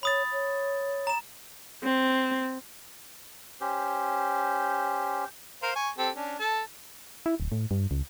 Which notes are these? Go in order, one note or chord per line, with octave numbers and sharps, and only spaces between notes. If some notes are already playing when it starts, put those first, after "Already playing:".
C#5 B5 D#6 A6
C#5
A#5 E7
C4
C#4 G4 C5
A#4 C5 F5
G#5 C#6
C4 G4 A4
C#4 D4
A4 A5
E4
D1
A2
G2
C#2